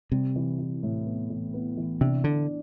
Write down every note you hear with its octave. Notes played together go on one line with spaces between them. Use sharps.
C3 G3
E3
E3
A2
B3
E3
B3
E3
C3 D4
D3 D4